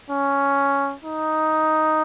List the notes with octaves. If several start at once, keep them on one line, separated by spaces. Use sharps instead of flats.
C#4
D#4